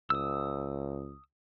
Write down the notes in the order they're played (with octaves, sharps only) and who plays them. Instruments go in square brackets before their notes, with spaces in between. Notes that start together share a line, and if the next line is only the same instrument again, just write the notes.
[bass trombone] C#2 [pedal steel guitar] D#6 E6